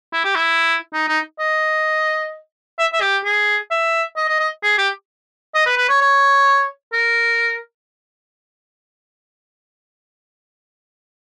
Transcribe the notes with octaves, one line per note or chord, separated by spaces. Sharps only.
E4
G4
E4
D#4
D#4
D#5
E5
E5
G4
G#4
E5
D#5
D#5
D#5
G#4
G4
D#5
B4
B4
C#5
C#5
A#4